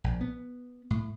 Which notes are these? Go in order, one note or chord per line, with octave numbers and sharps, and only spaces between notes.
A#1
B3
A2